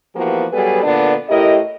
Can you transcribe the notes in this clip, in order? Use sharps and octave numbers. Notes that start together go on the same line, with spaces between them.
E3 F3 A#3 B3 F#4 G4
F#3 G3 B3 G#4 A4 B4
A#2 D3 B3 D4 D5
A2 E4 G4 A#4 D#5